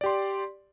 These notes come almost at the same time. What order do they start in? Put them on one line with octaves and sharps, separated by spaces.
D5 G4 C6